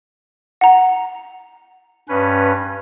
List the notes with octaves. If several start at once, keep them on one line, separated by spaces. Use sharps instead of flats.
F#5 A#5
G2 C#4 B4